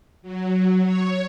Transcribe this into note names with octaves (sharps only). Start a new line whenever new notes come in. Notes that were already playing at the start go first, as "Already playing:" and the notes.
F#3
C#5